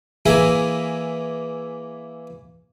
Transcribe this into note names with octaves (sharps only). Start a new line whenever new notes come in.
E3 A#3 G#4 A#4 E5